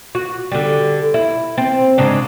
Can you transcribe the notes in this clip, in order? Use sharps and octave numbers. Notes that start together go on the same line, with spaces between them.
F#4
D3 G3
E4
C4
G#2 C#3 D4